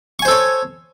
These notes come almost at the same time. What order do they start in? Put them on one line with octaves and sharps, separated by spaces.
C#6 G#5 C5 A4 C#5